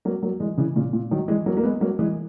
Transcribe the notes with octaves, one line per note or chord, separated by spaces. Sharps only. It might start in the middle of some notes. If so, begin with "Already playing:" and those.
F#3 A#3
F#3 A#3
E3 G#3
C#3 E3
A#2 C#3
A#2
D#3 F#3
E3 G#3
F#3 A#3
A#3
G#3 B3
F#3 A#3
E3 G#3